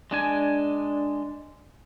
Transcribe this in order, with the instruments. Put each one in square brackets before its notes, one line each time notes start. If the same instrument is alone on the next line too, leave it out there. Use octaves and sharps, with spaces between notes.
[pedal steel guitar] G#3 D4 G#5